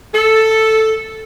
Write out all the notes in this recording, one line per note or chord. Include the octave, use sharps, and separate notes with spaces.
A4